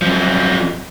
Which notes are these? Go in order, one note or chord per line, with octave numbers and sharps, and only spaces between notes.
F#2 F3